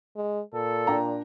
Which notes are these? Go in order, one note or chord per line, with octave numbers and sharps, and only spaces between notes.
G#3
A#2 A4
D4 G5 A#5